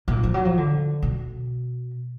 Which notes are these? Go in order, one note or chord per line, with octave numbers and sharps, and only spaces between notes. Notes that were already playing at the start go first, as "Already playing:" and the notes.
B2
A#2
F3
F#3
F3
D3
B2